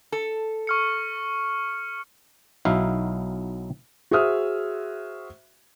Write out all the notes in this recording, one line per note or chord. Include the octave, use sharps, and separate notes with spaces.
A4
C#6 F6 C#7
B1 F#3 D#4 E4 E5 F5
F#4 G#4 C5 E5 D#6 F6